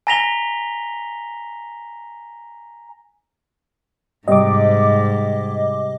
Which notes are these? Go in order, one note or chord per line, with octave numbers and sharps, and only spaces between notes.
G#5 A#5 A#6 B6 F7 G7
G#2 C3 G3 D#5 D6